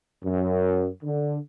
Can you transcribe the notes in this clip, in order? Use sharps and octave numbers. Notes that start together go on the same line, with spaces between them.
F#2
D3